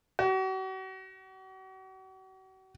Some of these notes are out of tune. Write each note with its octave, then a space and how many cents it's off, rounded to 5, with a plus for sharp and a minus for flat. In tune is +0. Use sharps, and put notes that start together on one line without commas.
F#4 +40